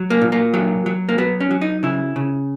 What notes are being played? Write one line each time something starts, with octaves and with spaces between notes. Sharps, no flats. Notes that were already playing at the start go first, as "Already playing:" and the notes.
Already playing: F#3
A#3
A#2
A#3
F#3
F#3
A#3
F#3 B3
C#4
F#3
D#4
C#3 E4
C#3